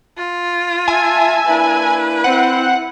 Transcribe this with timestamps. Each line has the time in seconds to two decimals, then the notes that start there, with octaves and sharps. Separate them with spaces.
0.18 F4
0.88 E5 G#5 A5
1.47 A#3 D4 E4 B4
2.24 C4 E4 F#5